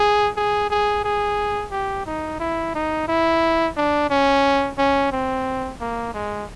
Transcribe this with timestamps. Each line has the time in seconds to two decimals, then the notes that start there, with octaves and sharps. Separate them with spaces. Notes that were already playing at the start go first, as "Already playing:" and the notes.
Already playing: G#4
0.36 G#4
0.70 G#4
1.04 G#4
1.72 G4
2.06 D#4
2.40 E4
2.75 D#4
3.08 E4
3.77 D4
4.10 C#4
4.78 C#4
5.12 C4
5.80 A#3
6.14 G#3